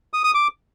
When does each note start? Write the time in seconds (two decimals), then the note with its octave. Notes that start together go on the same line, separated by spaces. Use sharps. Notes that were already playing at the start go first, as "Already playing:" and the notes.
0.13 D#6
0.24 D#6
0.34 D6